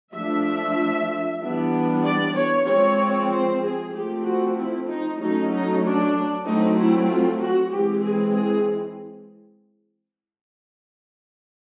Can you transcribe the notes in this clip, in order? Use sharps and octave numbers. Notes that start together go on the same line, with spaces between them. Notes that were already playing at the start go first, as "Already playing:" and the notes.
F3 A3 D4 E5
E3 G3 B3 D4
D5
C#5
F3 G#3 C4 C#5
C5
G#4
F3 A3 C4 G4
F#4
E4
D#4
F#3 A3 C#4 D#4
D#4
D4
F#3 A3 C4 D#4
E4
F4
F#4
E3 G#3 C4 G4
G#4
G#4